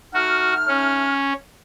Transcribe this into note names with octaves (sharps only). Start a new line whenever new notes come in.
A3 D#4 F#4 F6
C#4